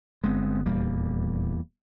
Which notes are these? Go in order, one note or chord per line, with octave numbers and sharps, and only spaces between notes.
G1 G#3 B3 C4
D#1 E2 G3 A#3